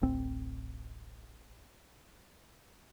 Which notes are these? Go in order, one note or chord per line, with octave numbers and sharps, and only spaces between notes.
D1 A1 C4